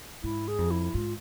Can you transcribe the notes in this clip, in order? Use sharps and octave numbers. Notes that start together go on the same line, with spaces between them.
G#2 E4
G#4
F2
E4
G#2 F4